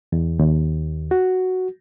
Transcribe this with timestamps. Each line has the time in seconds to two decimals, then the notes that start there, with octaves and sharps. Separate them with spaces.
0.12 E2
0.39 D#2
1.11 F#4